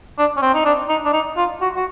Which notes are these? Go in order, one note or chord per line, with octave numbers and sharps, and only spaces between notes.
D4
C#4
C4
D#4
D4
D#4
D4
D#4
F4
F#4
F#4